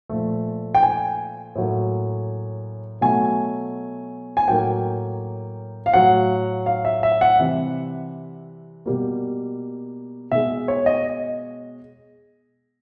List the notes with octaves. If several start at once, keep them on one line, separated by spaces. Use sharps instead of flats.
A#2 F3 A3
G5
G#5
A2 F#3 A#3
B2 F#3 A3 G#5
G#5
A2 F#3 A#3 G5
F5
A2 F#3 A3 F#5
F5
E5
E5
F#5
C3 E3 G3
B2 G3 A#3
B2 G#3 E5
C#5
D#5